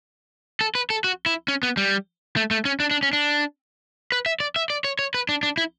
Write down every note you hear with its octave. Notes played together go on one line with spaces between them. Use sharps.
A4
B4
A4
F#4
E4
C#4
B3
G3
A3
A3
C#4
D4
D4
C#4
D4
B4
E5
D5
E5
D5
C#5
C#5
B4
D4
D4
E4